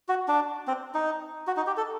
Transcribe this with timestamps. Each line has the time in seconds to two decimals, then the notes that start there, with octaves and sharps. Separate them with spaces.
0.09 F#4
0.28 D4
0.68 C4
0.94 D#4
1.47 F#4
1.57 D#4
1.67 G4
1.77 A4